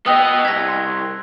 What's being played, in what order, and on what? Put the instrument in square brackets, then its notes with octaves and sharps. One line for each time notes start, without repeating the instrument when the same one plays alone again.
[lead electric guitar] B3 D#5 [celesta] G5 D#6 [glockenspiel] E6 F#6 F7
[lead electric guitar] C2 [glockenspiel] G#6 A#6 [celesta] B6
[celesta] C6